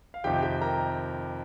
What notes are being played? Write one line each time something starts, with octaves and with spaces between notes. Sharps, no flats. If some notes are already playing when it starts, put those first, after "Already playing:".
F5
F2 C3 D#3 G4 G5
G4 G5
A#4 A#5